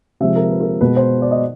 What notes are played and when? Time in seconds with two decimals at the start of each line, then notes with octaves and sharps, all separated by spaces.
0.20 C3 F3 G#3 E5
0.36 A#4
0.51 B4
0.61 A#4
0.81 B2 G#3 B4
0.96 C5
1.22 D5
1.31 D#5